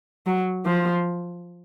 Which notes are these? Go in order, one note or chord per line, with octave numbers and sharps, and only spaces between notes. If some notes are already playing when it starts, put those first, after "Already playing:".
F#3
F3